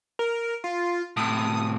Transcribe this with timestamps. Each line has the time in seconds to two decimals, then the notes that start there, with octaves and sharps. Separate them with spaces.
0.19 A#4
0.64 F4
1.17 A2 C3 D#6